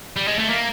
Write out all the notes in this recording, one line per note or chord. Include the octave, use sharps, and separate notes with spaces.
G3
G#3
A3
A#3